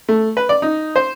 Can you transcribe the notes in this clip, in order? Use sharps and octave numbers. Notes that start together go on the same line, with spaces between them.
A3
B4
D5
D#4
C5